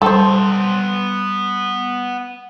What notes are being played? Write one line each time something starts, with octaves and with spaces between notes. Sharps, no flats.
G3 B3 A4 C5 C6